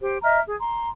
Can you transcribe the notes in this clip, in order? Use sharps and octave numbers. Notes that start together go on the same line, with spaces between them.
G4 C5
D#5 E5 A#5 F6
G#4
A#5 C6